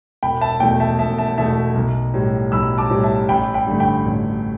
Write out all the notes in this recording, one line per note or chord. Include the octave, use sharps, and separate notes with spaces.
E1 G5 B5
E5 A5
E2 B2 A3 G5
E5 A5
E1 E5 A5
E5 A5
E2 B2 A3 E5 A5
B1
A2 G3
B1 B5 E6
A5 D6
A2 G3
E5 A5
A1 G5 B5
G5 B5
G2 D3 A3
G5 B5
A1